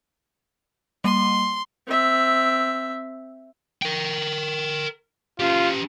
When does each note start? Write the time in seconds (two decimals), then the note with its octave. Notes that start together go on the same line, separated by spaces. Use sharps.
1.04 G3 A#3 C6 D#7
1.87 C4 E5
3.82 A#4 G5
5.40 C#4 F4 G4